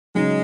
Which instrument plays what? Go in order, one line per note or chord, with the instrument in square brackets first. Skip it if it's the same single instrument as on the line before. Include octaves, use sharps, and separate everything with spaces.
[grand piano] C#3 F#3 D#4 [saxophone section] G#3